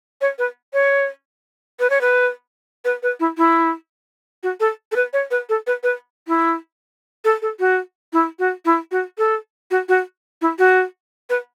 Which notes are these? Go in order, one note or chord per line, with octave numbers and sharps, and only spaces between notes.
C#5
B4
C#5
B4
C#5
B4
B4
B4
E4
E4
F#4
A4
A4
B4
C#5
B4
A4
B4
B4
E4
A4
A4
F#4
E4
F#4
E4
F#4
A4
F#4
F#4
E4
F#4
B4